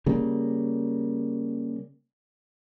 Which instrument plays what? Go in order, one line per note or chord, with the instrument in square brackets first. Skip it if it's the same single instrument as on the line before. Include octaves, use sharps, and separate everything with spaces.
[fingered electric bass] C#3 G3 A#3